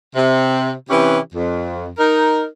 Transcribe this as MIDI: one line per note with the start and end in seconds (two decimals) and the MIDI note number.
0.15 0.72 48
0.90 1.18 48
0.90 1.18 52
0.90 1.18 61
0.90 1.18 64
0.90 1.18 67
0.90 1.18 71
1.34 1.89 41
1.98 2.45 63
1.98 2.45 70